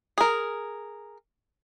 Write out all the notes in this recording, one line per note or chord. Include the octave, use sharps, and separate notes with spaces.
G#4 A#4